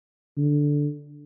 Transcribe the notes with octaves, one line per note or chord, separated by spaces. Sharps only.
D3